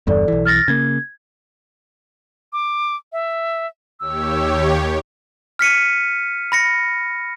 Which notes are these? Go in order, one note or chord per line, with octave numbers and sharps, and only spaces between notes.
G1 E2 G2 A4 D5
B1 E3
F6 A6 A#6
C#3 A#3 G#6
D6
E5
D#2 G4 C#5 E6
F6 B6 C#7 D#7
B5 A#6 C#7